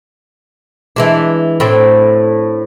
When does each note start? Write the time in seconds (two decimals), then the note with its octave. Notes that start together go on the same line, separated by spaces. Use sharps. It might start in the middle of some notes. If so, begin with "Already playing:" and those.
0.96 E3 G#3 D4
1.60 A2 C4 D4